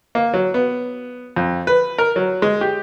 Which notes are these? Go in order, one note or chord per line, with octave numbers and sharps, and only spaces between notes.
A#3
F#3
B3
F2
B4
A#4
F#3
G#3
G4